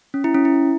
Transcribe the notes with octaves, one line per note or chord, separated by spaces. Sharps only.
C#4
E4
C#4
E4